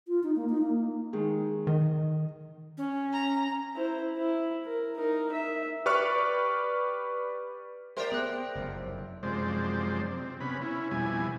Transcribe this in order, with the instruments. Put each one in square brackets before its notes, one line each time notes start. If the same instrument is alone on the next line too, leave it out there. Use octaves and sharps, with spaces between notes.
[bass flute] F4
D#4
A#3
D#4
A#3
[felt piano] D#3 G#3
[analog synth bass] D#3 [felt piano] D#5
[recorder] C#4
[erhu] A#5
[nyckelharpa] E4 C5
E4
A#4
D#4 A#4
E5
[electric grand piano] G4 B4 D5 C#6 F6
[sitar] G4 A#4 C5 [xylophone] D5 E5
[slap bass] B3 [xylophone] G#4 F#6
[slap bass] F#1 F2 C3
[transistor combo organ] F#2 C3 F3 G#3 C5 D5
C4
C3 B3 C#4 B5
C#4 E4
F2 B2 G3 E4 G#5